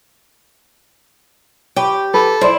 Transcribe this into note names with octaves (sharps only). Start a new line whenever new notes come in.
G4 B4 C#5
A4 B4
E4 C5 D5